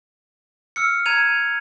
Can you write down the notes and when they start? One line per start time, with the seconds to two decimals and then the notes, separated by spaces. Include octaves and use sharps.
0.76 E6 F6 C#7
1.06 A#5 G#6 D#7 F7